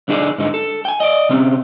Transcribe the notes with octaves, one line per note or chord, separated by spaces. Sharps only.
B1 D3 D#4 F4 G#4 D5
G#2 D3 D#4
A4
G5 G#5
D5 D#5
C3 C4 C#4